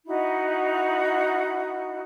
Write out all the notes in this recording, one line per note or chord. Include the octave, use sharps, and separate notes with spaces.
D#4 E4 F#4